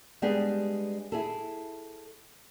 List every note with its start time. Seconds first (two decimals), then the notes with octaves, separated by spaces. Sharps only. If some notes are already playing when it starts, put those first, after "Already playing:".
0.22 G3 G#3 B3 D4 G4 G#4
1.12 E4 G#4 A4